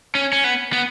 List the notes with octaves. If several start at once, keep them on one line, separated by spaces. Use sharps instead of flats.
C#4
C#4
B3
B3